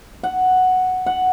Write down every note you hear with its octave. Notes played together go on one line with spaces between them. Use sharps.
F#5
F#5